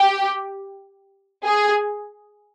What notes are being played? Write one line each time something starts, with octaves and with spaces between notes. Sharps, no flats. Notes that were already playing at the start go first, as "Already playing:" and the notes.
Already playing: G4
G#4